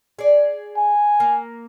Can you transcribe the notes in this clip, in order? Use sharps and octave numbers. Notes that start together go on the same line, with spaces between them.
G#4 D5
G#5
A#3